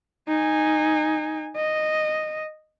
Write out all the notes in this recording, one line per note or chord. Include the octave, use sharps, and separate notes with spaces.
D#4 G#5
D#5